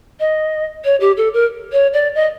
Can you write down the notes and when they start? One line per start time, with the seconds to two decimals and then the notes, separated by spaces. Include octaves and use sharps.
0.20 D#5
0.84 C#5
1.00 G4
1.17 A4
1.34 A#4
1.72 C#5
1.93 D5
2.15 D#5